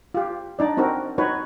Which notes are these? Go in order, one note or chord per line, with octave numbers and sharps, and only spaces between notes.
F4 G4
D4 D#4 D5
C4 D#4 F#4 A#4
D#4 F#4 B4 C#5